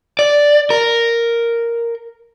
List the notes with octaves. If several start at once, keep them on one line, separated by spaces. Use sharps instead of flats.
D5
A#4